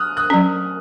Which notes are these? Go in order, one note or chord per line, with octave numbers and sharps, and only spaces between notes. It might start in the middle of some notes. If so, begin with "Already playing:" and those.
Already playing: D#6 F6 F#6
D#6 F#6
F#3 C#4